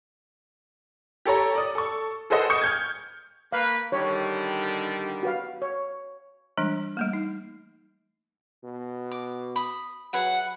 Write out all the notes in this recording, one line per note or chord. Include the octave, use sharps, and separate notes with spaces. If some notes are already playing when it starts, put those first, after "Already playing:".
G4 A4 C#5 A#5
D5 D#6
A4 C#6
G#4 A4 B4 C5 D#5 F#5
C#6 D#6 G6 C#7
F6 G6 G#6
A#3 B4 F5
D3 D#3 G3 C#5
F#4 B4 F5
C#5
E3 G3 G#3 D4
G3 A3 A#3
D#4
B2
D6
B5 D#6
F#3 G#4 B4 E5 F#5